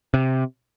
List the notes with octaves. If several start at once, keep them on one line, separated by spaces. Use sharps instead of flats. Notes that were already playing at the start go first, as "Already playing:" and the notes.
C3